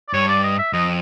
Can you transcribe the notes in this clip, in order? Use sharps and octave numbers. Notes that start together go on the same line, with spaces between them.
D5
G2 C#5
D5
D#5
E5
F2 D#5